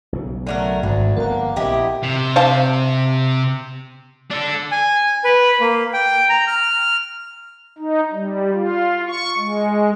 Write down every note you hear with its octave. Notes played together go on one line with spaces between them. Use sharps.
B1 C#3
D3 F#3 A3 A#4
G#1 D2 G#2 D3
G1 F3 A#3 B3 A#4 F#5
A#1 C3 E4 G4 D#5
C3
C5 F5 A5
D4 A4
G#5
B4
A#3
G5
A#5
F6
D#4
G3
F4
C#6
G#3